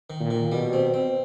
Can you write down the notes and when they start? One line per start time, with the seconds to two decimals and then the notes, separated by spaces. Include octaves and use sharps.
0.10 D#3
0.20 A#2
0.30 D#3
0.51 B2 G3
0.73 C4
0.94 C4